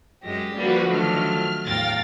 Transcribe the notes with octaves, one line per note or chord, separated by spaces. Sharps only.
F#2 G#3 G4 A#6
D3 F3 G3 A#3 F#4 B4
D#3 F#3 A3 D4 F6
E2 A2 F5 G5 F6 A6 A#6